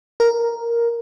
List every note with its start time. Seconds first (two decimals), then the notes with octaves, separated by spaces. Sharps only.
0.20 A#4